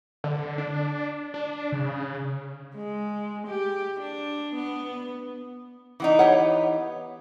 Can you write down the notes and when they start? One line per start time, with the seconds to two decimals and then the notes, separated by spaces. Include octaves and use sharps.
0.24 D3
0.58 D4
1.34 D4
1.72 C#3
2.74 G#3
3.47 G4
4.00 D4
4.54 B3
6.00 E3 B3 D#4
6.19 G4 C#5 F#5